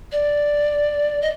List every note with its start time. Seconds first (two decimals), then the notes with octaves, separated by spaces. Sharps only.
0.12 D5
1.21 D#5